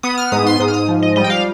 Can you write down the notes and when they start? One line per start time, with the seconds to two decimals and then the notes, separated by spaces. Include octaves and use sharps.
0.03 B3 D#6
0.18 F6
0.32 G#2 D#6
0.47 C6
0.60 G#2 D#6
0.68 F6
0.74 D#6
0.88 F3
1.03 D#5
1.16 G3 D#5
1.24 G5
1.30 F5